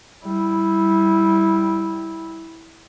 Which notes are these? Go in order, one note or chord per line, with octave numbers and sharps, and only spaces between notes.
G3 E4